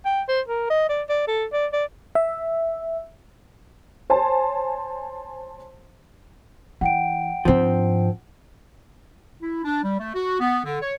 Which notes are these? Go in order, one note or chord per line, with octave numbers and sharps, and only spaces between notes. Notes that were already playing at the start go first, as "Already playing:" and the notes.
G5
C5
A#4
D#5
D5
D5
A4
D5
D5
E5
C5 C#5 G#5 A5 C6
E3 F#5 G5 D7
G#2 F3 C4 D4
E4
D4
G3
A3
F#4
B3
D3
C#5